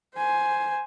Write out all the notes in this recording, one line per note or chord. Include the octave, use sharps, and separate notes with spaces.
C5 G#5